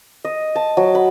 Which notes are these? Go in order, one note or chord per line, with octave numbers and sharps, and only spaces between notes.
D#5
A5
F#3
B5